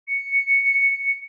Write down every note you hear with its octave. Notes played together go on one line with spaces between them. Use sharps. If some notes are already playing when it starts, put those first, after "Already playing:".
C#7